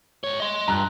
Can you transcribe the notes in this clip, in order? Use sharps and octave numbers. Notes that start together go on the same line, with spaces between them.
G#2 C#5
D#5 C6
G2 A#5 F#6